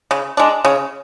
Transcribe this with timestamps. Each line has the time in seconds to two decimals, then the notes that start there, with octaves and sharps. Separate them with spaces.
0.11 C#3
0.37 G#3 D4
0.65 C#3